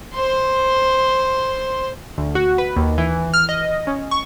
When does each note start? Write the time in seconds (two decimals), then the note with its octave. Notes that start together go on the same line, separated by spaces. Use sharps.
0.14 C5 C6
2.18 D2
2.35 F#4
2.58 B4
2.76 D#2
2.98 E3
3.34 F6
3.49 D#5
3.87 C#4
4.11 C#6